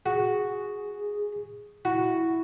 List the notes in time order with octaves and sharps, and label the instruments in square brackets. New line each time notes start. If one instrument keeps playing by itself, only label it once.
[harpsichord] F#4 [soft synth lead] G#4
[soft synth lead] E4 [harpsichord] F#4